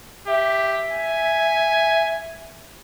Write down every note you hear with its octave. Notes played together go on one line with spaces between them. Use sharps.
G4 E5
G#5